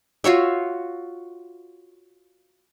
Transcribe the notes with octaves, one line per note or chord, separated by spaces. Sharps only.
F4 F#4 C#5 E5